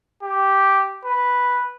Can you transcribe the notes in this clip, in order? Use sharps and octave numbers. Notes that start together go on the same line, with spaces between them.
G4
B4